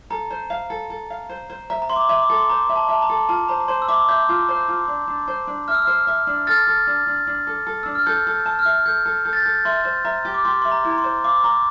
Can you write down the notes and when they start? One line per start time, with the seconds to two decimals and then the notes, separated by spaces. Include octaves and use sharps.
0.10 A4 A#5
0.30 C5
0.50 F5
0.70 A4
0.90 A4
1.10 F5
1.29 C5
1.50 C5
1.70 E5 A#5
1.82 A#5
1.89 E5 C6
1.96 D6
2.09 E5
2.23 D6
2.30 A4
2.38 C6
2.49 C5 A#5
2.69 E5
2.76 A5
2.88 E5 A5
3.02 A#5
3.10 A4
3.29 F4 A5
3.48 C5 A#5
3.60 A#5
3.68 C5 C6
3.82 E6
3.88 E5 D6
4.08 E5 G6
4.29 F4
4.48 C5
4.68 F4
4.88 D4
5.08 D4
5.28 C5
5.47 D4
5.68 E5 F6
5.75 E6
5.82 F6
5.87 C5
6.07 E5
6.27 D4
6.47 A4 F6 A6
6.67 A4
6.87 D4
7.07 D4
7.27 D4
7.47 A4
7.67 A4
7.83 D4 E6
7.95 F6
8.06 A4 G6
8.27 A4
8.33 G6
8.46 A5
8.59 F6
8.65 E5
8.86 A4 G6
9.05 A4
9.25 A4 G6
9.33 A6
9.40 G6
9.45 A4
9.65 E5 C6
9.85 C5
10.05 E5 A#5
10.25 G4
10.34 D6
10.45 G4 C6
10.62 E5 C6
10.72 A#5
10.85 E4
10.90 A#5
10.98 C6
11.04 C5
11.24 F5 D6
11.44 A#5